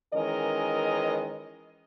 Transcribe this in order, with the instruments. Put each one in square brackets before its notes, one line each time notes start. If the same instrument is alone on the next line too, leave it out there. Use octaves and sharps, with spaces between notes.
[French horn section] D#3 E3 G#3 C#4 A#4 D#5